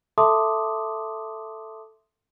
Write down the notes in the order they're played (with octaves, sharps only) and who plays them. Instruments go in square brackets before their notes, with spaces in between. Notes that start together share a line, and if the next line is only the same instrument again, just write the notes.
[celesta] A4 E5 A5 C6 D6 D#6